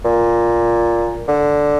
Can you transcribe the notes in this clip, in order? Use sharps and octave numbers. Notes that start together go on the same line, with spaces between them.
A#2
D3